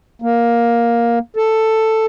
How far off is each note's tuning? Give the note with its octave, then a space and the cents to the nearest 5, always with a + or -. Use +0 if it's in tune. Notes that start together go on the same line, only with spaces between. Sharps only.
A#3 +10
A4 +5